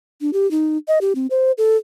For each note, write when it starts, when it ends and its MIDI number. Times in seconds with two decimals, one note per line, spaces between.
0.21 0.30 62
0.33 0.49 67
0.51 0.77 63
0.88 0.99 75
1.01 1.13 67
1.15 1.27 60
1.30 1.52 72
1.58 1.77 69